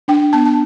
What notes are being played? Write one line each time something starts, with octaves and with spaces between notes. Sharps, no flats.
D4 G5
B3 A5
A5